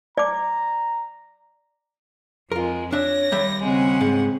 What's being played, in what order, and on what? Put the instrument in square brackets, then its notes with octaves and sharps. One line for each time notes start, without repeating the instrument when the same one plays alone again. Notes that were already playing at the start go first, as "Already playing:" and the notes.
[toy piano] D5 D6 [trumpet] A#5
[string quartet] F2 G#3 [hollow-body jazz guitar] F4 A#4
[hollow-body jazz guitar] D4 E5 [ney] C#5 [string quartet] A#6
[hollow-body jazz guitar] D#2 G3 E5
[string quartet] C#3 G#3 F#5 [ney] C4
[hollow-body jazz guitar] G#2